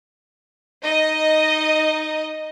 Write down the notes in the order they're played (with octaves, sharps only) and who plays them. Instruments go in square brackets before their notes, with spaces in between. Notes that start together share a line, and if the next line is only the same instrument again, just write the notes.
[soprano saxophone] D#4 [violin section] D#5